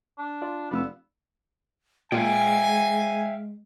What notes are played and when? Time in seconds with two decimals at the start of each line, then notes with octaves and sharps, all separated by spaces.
0.18 D4
0.42 F4 D5
0.71 F1 B3 D5 F5 E6
2.12 A#2 G#3 E5 F5 G5 G#5